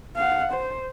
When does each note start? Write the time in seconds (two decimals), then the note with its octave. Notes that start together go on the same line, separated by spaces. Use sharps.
0.16 F5 F#5
0.53 C5